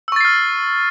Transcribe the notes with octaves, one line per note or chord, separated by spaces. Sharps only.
C#6 E6 F6 A6 C7